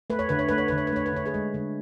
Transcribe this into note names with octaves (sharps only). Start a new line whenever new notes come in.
A3 B4
C#5
D3 B4
C#5
A3 B4
C#5
D3 B4
C#5
B4
A3 C#5
B4
D3 C#5
G#4 B4
G#3
D3